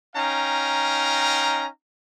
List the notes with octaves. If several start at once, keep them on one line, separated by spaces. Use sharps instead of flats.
C#4 D#4 F5 G5 A#5